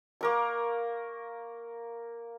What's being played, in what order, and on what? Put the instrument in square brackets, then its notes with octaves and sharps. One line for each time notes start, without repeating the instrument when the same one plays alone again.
[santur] A#3 A#4 C#6